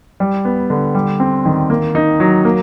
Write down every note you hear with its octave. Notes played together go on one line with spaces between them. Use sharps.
G3
B3
D3
G3
C4
D#3
A#3
D#4
F#3
A#3